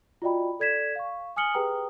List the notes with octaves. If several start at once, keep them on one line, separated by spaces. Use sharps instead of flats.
F4 F#4 D5 D#5 G5 B5
A4 D5 G#6 B6 E7
F5 C#6
G#5 D#6 F6 C#7 F#7 G7
G4 G#4 B4 G5 A#5 D#6